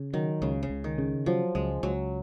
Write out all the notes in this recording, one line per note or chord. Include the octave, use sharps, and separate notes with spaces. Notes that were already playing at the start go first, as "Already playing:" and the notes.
Already playing: C#3
D#3 F#3
C#2 C#3
C#3
C#2
D#3
C#3
F3 F#3
C#2 G#3
C#2 F#3